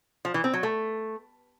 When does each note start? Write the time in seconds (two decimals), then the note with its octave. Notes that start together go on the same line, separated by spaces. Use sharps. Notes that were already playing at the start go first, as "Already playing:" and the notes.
0.25 F3
0.34 E3
0.44 C4
0.53 F#3
0.63 A3